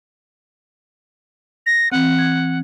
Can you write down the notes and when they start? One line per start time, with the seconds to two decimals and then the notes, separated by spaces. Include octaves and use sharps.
1.66 A#6
1.92 E3 C4 F#5
2.18 G#6